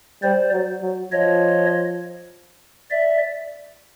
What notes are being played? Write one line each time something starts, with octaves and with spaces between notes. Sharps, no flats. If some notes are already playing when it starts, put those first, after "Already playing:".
G3 C5 D5
F#3
F#3
F3 C#5 D#5
D5 E5